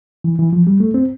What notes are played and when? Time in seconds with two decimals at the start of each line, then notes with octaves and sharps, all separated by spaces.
0.24 E3
0.39 E3
0.53 F3
0.67 G3
0.80 A3
0.94 C4